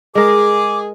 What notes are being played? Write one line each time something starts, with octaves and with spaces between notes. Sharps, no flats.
G#3 G#4 A#4 D6